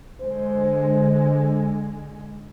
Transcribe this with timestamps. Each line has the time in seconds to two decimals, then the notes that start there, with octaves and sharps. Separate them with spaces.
0.21 D3 G#3 C5